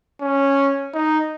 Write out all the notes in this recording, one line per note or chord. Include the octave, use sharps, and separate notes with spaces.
C#4
D#4